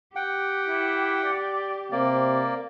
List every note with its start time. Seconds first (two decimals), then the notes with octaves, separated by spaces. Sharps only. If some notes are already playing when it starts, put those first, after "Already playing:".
0.16 G4 F#5 G5
0.68 E4
1.24 D5
1.92 C3 A#3 D5